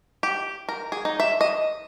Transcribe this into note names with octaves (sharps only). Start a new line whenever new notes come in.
G4
A#4
G#4
D#4
E5
D#5